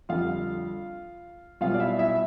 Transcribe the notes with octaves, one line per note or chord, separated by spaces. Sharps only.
F2 D3 G3 F4 F5
B1 B2 G3 F4 F5
D5
E4 E5
E4 E5